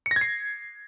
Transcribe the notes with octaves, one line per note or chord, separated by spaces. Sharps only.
C#7
A#6
G#6
C7